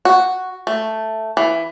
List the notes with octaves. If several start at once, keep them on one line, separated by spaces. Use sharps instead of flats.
F#4
A3
E3